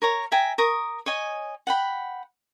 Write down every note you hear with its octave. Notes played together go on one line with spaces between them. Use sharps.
A#4 C#5 A#5
E5 G5 G#5 A#5
A#4 C#6 D#6
C#5 D#5 G#5
F#5 G5 B5